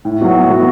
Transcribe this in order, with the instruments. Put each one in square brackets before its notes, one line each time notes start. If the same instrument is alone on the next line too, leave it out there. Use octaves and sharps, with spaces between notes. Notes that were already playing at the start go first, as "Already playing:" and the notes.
[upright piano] A2
F#3 B3 F#4
A2
F#3 B3 F#4